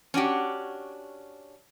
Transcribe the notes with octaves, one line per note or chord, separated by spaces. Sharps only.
C#4 D4 F#4 G4